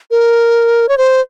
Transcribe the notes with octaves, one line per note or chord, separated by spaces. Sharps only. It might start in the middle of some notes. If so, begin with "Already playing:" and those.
A#4
C#5
C5